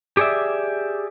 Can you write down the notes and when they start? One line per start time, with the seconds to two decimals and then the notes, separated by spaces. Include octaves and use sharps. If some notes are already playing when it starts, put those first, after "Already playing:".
0.17 G4 G#4 C#5 D5 E5